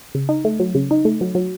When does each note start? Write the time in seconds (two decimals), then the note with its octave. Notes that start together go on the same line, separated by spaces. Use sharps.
0.15 C#3
0.29 D#4
0.45 A3
0.60 F#3
0.75 C#3
0.91 D#4
1.05 A3
1.21 F#3
1.35 F#3